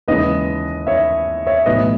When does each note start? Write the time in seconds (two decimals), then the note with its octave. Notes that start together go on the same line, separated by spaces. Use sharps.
0.08 D#2 C#3 E3 G#3 B4 D#5
0.87 C#5 E5
1.47 C#5 E5
1.66 B1 A2 E3 B4 D#5